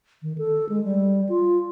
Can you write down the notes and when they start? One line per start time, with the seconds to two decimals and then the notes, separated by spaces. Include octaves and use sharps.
0.22 D#3
0.38 A4
0.69 G#3
0.84 G3
1.29 F4